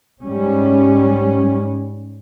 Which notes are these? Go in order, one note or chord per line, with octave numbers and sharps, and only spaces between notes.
G#2 G3 C#4